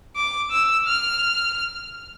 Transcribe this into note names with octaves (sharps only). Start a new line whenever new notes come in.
D6
E6
F6